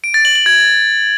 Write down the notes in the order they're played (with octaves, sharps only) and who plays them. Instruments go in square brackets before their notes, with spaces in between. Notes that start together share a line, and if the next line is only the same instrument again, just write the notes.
[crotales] D7
A6
F#7
F#7
G#6